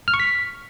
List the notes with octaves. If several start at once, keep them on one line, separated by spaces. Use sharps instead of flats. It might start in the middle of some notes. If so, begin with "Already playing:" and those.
F6
C#6
B6